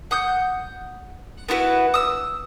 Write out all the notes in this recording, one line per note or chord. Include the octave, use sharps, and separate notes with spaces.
F#5 D#6 G6
B3 E4 F#4 B4
D#6 E6